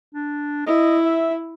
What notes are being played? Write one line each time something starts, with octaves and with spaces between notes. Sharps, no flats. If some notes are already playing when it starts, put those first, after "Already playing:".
D4
E4 D#5
E5